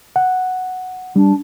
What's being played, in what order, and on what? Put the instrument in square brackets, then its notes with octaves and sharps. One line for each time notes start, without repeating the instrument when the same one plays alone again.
[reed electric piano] F#5
[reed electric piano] G3 [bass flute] D4